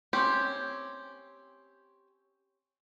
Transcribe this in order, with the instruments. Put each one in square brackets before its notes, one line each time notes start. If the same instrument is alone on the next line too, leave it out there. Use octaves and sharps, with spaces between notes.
[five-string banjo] C4 C#4 G4